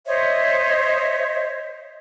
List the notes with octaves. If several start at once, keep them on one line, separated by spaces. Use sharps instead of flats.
C5 C#5 D#5 E5